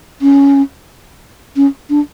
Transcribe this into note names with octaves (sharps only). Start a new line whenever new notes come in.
C#4
C#4
D4